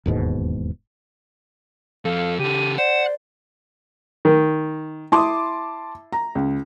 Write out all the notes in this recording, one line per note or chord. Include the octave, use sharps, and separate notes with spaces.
E1 D#2 G#2 B2
F2 A4 F5
C#3 G4 A4 D#7
C5 D5 F#5 E7
D#3
E4 A5 C6 D6 D#6
A#5
C#2